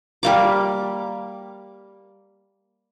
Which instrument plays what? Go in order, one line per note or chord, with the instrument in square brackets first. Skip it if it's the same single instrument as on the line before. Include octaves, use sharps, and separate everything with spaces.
[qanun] G3 A#3 D6